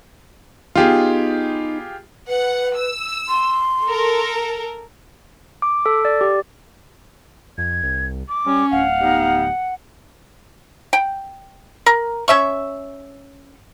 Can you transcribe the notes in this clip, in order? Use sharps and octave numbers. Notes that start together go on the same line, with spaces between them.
B3 D#4 F4 G4 G#4
B4 F#5
E6
C6
A4 A#4
D6
A4
D5
G4
F2 G#6
C2
D6
G3 C#4
D1 F5 F#5
G3 B3 D#4
G5
A#4
C#4 E5 C#6